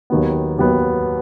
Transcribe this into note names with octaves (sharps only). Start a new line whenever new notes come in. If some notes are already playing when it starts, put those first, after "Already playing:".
D#2 D#3 F#3 B3
D#2 D#3 F#3 B3